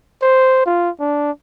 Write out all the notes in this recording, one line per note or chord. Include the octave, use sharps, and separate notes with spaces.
C5
F4
D4